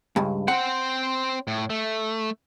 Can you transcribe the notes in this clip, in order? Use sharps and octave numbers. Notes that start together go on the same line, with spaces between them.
C#2 G2
C4 C5 F#5
A2
A3